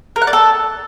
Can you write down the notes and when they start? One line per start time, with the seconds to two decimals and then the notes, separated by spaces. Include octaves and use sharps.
0.16 A#4
0.22 F#5
0.27 D5
0.33 A4